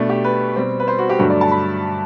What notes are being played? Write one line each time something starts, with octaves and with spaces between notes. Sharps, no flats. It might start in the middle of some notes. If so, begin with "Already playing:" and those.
Already playing: B2 A3 D4
G4
B4
B2 G3 C4
B4
C5
F#4
G4
G2 D3 F#3 A3 F#4
D5
A5
B5